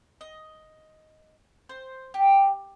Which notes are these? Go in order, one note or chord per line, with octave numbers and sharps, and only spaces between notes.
D#5
C5
G4